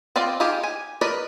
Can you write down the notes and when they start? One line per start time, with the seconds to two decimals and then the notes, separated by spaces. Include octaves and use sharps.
0.16 C4 F4 D5 D#5
0.40 D#4 F4 G4 G#4
0.63 G#5
1.01 A#4 B4 D5 D#5